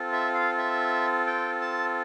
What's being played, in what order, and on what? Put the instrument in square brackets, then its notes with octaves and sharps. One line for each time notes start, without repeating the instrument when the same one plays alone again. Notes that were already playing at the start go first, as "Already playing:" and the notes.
Already playing: [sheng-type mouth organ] C4 F4 A4
E5
F5
E5
G5
A5